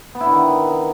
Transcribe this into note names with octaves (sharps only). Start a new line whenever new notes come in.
B3
E4
D3
D#3